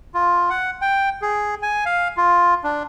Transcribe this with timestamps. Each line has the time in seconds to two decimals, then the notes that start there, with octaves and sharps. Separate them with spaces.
0.14 F4
0.50 F#5
0.81 G5
1.22 G#4
1.63 G#5
1.86 F5
2.17 F4
2.64 D4